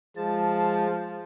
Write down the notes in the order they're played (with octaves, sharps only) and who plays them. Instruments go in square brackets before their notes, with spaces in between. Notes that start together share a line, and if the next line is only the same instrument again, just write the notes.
[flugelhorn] F3 [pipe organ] G#3 A5